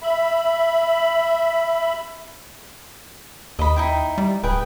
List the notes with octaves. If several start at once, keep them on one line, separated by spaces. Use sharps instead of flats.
E5 B5
D#2 D#5 B5
D#4 E4 G5
G3
D1 G#4 B4 G5